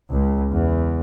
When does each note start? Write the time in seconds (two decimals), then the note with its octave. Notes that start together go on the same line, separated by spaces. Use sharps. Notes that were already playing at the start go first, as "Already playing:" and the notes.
0.11 C#2
0.52 E2